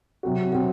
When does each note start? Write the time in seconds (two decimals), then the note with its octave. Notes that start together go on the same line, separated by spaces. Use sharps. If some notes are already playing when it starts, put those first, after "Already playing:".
0.23 C3 F#3 C4 F#4
0.52 C3 F#3 C4 F#4